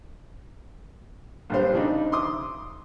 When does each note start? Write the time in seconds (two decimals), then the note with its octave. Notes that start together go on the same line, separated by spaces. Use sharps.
1.50 A#1 G2 C5
1.73 C#3 D4 D#4
2.12 C6 D6 D#6